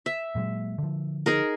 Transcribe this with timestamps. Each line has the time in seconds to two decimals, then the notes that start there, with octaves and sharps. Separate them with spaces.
0.06 E5
0.35 A#2 F#3 G#3
0.78 D3 F3
1.26 D#4 G#4 A#4